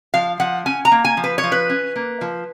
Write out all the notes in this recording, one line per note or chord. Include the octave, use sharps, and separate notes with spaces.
F3 F5
F3 F#5
C#4 G#5
A#5
A#3
G#5
F3
B4
C#5
F3
B4
C#4
A#3
F3